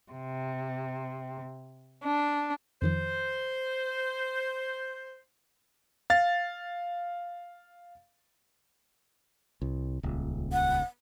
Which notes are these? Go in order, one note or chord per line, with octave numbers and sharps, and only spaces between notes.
C3
D4
F2 D#3 F3 C5
F5 A6
C2
D#1 C#2
F#5